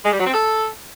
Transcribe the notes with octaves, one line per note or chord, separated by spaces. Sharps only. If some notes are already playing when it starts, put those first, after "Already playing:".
G#3
G3
F#3
C4
A4